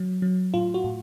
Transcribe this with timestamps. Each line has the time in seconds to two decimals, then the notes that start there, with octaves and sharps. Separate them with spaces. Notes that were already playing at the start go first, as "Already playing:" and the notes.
Already playing: F#3
0.22 F#3
0.54 A2 F4
0.74 F#4
0.84 A2